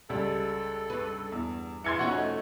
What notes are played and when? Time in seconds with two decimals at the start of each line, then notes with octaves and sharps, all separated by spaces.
0.10 C#2 G3 A4
0.90 G2 B4
1.32 E2
1.84 E3 C6 G#6 C#7
1.99 F2 C#4 D#4 F#4 F#5
2.17 A3